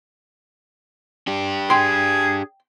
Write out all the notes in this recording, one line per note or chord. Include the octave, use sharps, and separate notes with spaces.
D4 G4
G#4 G5 C6